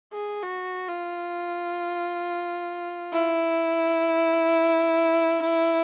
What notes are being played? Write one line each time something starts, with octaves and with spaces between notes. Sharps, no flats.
G#4
F#4
F4
E4